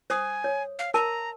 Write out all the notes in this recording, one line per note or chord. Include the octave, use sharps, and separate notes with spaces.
C5 G#5 D#6
C#5
F5
A#4 A5 A#5